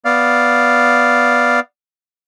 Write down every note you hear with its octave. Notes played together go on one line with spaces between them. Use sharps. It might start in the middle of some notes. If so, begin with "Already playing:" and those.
B3 D5 F5